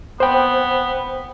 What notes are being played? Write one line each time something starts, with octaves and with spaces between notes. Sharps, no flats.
B3 C5 G5